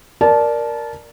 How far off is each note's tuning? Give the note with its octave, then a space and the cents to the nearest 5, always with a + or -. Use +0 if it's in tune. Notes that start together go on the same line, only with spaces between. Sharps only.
A#4 +0 D5 +0 A5 -20